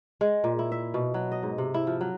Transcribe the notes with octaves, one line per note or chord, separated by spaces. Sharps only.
G#3
A#2
E4
E5
B2
F#3
D#5
G#2
C3
E4
F3
F#3